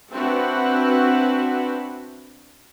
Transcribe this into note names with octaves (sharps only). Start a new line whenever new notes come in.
C4 D4 E4 F#4 B4